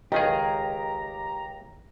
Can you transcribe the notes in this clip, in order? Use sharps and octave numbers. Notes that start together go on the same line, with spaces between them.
C#2 D#3 G4 G#4 D#5 A#5